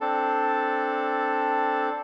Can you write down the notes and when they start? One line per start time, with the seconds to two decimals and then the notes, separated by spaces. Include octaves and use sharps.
0.01 C4 D4 A4